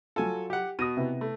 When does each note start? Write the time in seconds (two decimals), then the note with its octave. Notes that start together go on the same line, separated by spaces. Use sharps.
0.16 F#3 F4 A4 G#5
0.50 G4 F#5
0.79 B2 D#6 A#6 D#7
0.97 C3 B3 E4
1.21 A3